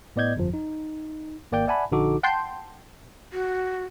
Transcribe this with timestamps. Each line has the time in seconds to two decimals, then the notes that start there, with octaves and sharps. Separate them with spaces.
0.16 A2 B3 D5 D#5 G6 G#6
0.36 G1 F2 F3
0.54 D#4
1.52 G#1 A#3 D5 G5 G6
1.67 D5 E5 F#5 G#5 A5 B5
1.91 A#1 D3 D#4 F#4 A4 D6
2.23 F#5 G5 A5 C6 G6
3.32 F#4